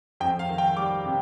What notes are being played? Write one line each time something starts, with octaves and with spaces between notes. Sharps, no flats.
F2 G5
F5
D#3
G5
G3 D6
C3